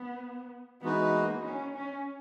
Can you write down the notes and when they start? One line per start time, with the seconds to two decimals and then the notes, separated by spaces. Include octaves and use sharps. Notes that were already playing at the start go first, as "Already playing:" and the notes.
Already playing: B3
0.81 E3 G#3 B3 D#4 F#4 B4
1.12 A#3
1.44 C#4
1.76 C#4